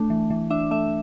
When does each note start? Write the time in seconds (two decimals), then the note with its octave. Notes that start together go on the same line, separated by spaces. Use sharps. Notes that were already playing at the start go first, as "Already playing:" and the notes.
Already playing: A3 D4
0.10 E3
0.30 E3
0.50 D4 E5
0.71 A3 E5